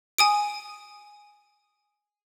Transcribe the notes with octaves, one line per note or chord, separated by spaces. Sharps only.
G#5 D#6 D7